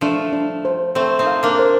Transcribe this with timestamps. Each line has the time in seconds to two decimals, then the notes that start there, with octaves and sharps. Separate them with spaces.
0.01 F3 A3 D4
0.33 D4
0.65 C5
0.95 A3 C4 C5
1.19 C4 D#4
1.27 F5
1.43 A#3 D4
1.59 C5